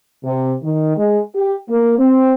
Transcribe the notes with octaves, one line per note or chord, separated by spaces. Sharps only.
C3
D#3
G#3
G4
A#3
C4